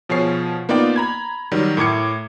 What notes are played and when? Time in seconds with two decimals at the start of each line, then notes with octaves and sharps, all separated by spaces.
0.09 B2 F3 G#4 C#5 C7
0.69 A#3 B3 D#4 F4 D5 G5
0.96 A#5 B5 G#6
1.51 D#3 F#3 G3
1.77 A2 A#4 D6 G#6 C#7